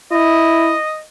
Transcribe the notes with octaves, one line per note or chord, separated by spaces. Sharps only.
E4 D#5